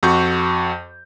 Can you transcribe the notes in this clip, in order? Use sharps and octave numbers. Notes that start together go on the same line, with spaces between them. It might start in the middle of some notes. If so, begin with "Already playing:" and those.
F2 F#4 C#6 G6